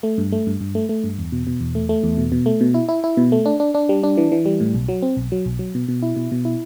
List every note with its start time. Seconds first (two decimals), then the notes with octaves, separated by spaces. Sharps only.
0.03 A3
0.18 G2
0.32 A3
0.47 G2
0.60 G2
0.75 A3
0.89 A3
1.04 G2
1.18 E2
1.32 B2
1.47 B2
1.60 E2
1.75 A3
1.89 A3
2.04 E2
2.17 B2
2.32 B2
2.46 A3
2.61 B2
2.74 E4
2.89 E4
3.04 E4
3.17 B2
3.32 A3
3.45 D4
3.60 D4
3.74 D4
3.89 G3
4.03 D4
4.17 E3
4.32 E3
4.46 G3
4.60 A2
4.74 B1
4.89 F#3
5.02 C4
5.16 B1
5.32 F#3
5.46 B1
5.59 F#3
5.75 B2
5.89 B2
6.03 E4
6.16 B2
6.32 B2
6.45 E4